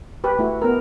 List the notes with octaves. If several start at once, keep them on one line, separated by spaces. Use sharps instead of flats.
G4 B4
A3 E4 F#4
B3 A#4